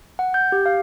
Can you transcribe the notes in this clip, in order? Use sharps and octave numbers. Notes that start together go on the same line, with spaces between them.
F#5
G6
G4
F5